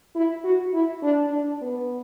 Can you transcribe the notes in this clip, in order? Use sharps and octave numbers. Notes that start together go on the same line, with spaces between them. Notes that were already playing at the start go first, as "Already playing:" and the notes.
E4
F#4
E4
D4
D4
B3